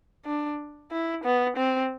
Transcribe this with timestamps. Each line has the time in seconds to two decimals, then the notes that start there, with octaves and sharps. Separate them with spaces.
0.26 D4
0.92 E4
1.24 B3
1.57 C4